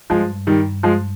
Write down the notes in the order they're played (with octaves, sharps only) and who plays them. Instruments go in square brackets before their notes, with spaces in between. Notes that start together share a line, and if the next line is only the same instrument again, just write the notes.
[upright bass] G2 [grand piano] F3 G#3
[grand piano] D#3 G3
F3 G#3